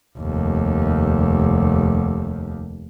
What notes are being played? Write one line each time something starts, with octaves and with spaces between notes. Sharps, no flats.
F1 D#2